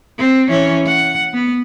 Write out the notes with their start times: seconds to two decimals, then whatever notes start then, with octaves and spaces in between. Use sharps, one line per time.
0.18 C4
0.49 E3 C#4
0.86 F#5
1.33 B3